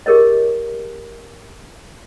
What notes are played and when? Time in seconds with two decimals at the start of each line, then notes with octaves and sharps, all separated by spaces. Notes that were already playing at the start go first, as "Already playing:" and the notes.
0.06 G4 G#4 A#4 C#5 D#5